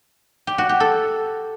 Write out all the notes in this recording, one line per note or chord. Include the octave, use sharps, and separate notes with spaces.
G4
F#4
G4
A4